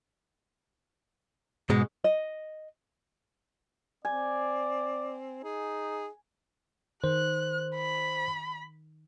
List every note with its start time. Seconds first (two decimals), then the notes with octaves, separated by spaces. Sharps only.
1.70 G#2 B2 G#3
2.04 D#5
4.05 C4 D5 G#5
5.44 D#4 G#4
7.04 D#3 C5 F#6
7.76 B5